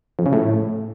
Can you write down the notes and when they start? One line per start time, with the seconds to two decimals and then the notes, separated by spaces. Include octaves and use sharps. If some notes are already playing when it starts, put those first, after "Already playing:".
0.19 F2
0.26 C#3
0.33 A2